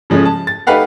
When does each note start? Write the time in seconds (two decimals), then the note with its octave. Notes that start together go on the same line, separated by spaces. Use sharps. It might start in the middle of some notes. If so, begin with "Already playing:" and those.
0.10 C#3 F3 G#3 A3 C#4
0.25 A5
0.47 A6
0.67 A3 D#4 G4 B4 F5 F#5